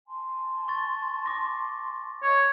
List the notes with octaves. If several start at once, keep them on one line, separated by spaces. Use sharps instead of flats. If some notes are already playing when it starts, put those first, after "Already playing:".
G#5 A5 C6
C#6 A6
D6 A#6
C#5 D#5 F5 G#6